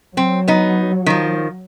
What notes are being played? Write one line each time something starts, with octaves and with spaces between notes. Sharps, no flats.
F#3 C4
B3 D#4
D#3 F3